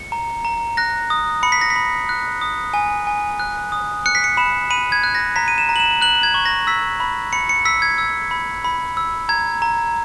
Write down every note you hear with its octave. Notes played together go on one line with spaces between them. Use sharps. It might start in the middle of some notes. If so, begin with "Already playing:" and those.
Already playing: C#7
A#5
A#5
F#6 A#6
D#6
B5 C#7
B6
A#6
B6
B5
F#6
D#6
G#5
G#5
F#6
D#6
F#6 C#7
B6
C#7
B5 E7
B5 D#7
G#6
F#6
A#6
A#5 B6
D#7
E7
A#5
F#7
E7
F#6 F#7
G#6
C#6
A#6
E6 B6
B5
B5 C#7
C#7
E6 B6
G#6
E6
B5
B5
E6
A#5 G#6
A#5